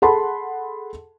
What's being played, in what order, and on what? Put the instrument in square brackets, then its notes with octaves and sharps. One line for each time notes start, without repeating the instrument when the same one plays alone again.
[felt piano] G#4 A4 F#5 A5 B5 C6